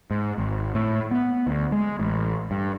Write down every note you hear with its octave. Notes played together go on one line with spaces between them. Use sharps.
G#2
G#1
A2
B3
D2
G#3
A1
G2